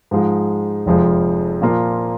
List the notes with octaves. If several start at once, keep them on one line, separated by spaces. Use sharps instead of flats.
G#2 F3 G#3
F1 F2 F3 G#3
A#2 F3 A#3 F4